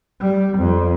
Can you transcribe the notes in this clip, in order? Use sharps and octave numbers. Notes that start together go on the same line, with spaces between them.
G3
F2